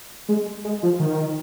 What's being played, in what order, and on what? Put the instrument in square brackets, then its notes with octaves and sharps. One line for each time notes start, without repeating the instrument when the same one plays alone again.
[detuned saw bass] G#3
G#3
F3
D#3